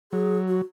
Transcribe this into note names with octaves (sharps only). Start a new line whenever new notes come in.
F#3 G#4
F#4